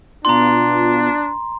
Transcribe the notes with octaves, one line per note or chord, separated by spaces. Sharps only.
B2 B3 D4 F4 A#5 C6